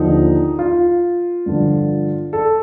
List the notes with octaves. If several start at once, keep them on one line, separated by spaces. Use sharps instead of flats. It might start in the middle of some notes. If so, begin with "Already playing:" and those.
Already playing: D#2 D3 F3 D#4
F4
G2 D3 F3
A4